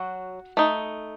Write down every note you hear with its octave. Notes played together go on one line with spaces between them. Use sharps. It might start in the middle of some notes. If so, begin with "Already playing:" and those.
Already playing: F#3 F#4
A3 D#4